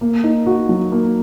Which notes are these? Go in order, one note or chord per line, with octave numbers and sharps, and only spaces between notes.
A#3
D#4
F#4
F#3
A#3